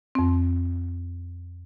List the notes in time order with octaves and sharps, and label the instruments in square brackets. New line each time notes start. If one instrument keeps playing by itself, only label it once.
[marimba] F2 C4